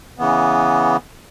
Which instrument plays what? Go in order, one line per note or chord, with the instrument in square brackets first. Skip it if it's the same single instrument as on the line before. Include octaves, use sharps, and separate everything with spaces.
[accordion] C#3 E3 B3